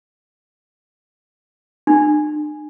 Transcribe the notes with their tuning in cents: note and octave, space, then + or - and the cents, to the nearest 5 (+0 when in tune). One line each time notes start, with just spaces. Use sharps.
D4 +25